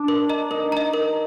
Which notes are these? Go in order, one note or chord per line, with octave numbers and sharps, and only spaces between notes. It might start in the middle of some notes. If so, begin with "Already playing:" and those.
Already playing: D4
A#4
D#5 A#5
D#4 A#4
D#5 A#5
A#4